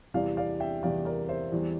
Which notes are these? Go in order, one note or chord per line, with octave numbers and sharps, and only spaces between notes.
E2 C3 E3 G3 D5 F5
D5 F5
E5 G5
E2 C3 E3 G3 D5 F5
A#4 D5
C5 E5
E2 E3 G3